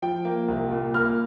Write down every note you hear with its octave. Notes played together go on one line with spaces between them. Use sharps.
F3 G5
A#3
C2
A#2
A#3 F6